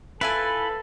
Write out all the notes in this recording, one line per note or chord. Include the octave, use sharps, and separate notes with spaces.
E4 F4 A4 B4 G#5